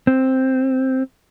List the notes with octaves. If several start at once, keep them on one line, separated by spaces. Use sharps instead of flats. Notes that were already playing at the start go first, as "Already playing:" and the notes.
C4